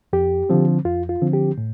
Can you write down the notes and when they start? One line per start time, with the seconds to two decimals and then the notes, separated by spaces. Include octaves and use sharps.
0.13 F2 G4
0.49 D3 F3 C4
0.85 F2 F4
1.09 F4
1.22 D3 F3 C4
1.33 G4
1.58 A2